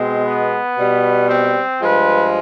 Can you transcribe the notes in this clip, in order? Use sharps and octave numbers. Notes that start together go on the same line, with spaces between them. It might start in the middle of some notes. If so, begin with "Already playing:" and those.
Already playing: B2 G#3 C4
B3
B2 G3
C4
G2 F3 G#3 B4